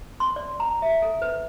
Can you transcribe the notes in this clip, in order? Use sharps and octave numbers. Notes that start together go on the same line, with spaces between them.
C6
D5
A#5
E5
A4
B4